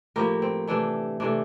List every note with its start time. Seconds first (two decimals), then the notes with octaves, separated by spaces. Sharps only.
0.16 A2 F3 A#3 G4 A#4
0.42 C4
0.68 C3 E3 A3 D4
1.20 C3 E3 A3 D4